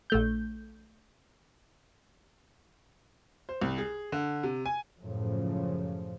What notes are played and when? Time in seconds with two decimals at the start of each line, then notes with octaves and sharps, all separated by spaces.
0.10 A#1 A3 G6
3.49 C5
3.62 C2
3.78 G#4
4.12 D3
4.43 C3
4.66 G#5
5.00 F#2 A2 C#3 F3